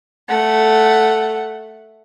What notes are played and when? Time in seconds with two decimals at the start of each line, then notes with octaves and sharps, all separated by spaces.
0.28 A3 F#5